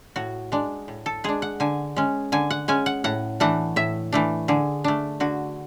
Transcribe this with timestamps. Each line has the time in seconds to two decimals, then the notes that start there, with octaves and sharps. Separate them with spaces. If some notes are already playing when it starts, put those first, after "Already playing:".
0.16 A2 F#4
0.52 G#3 D4
0.88 A2
1.06 A4
1.24 G#3 D4 G#4
1.42 F#5
1.60 D3 G#5
1.97 G#3 C#4
2.32 D3 G#5
2.50 F#5
2.68 G#3 C#4 G#5
2.86 F#5
3.04 A2 F#5
3.40 E3 A3 D4 F#5
3.76 A2 E5
4.12 E3 A3 D4
4.48 D3 G#4
4.84 A3 D4
5.20 D3 F#4